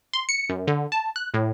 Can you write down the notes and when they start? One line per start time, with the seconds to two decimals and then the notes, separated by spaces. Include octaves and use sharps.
0.14 C6
0.29 C#7
0.50 F#2
0.67 D3
0.92 A5
1.16 F#6
1.34 A2